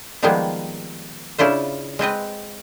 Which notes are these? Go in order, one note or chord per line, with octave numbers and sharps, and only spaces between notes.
D#3 F3 G3 G#3 A#3 B3
C#3 D4 E4 F4 C5
G#3 C4 B4 D#5